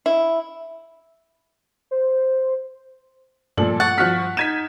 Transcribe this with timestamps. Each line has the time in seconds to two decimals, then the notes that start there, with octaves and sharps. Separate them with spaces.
0.06 E4
1.91 C5
3.57 G2 A#2 F3 A4 D5 F#7
3.80 F#5 C#6 A6
3.98 F3 F#4 F6 F#6 B6
4.37 D#4 G6 G#6 B6 D#7 E7